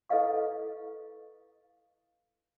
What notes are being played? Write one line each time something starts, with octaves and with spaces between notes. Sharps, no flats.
E4 A4 B4 D#5 F5 C#6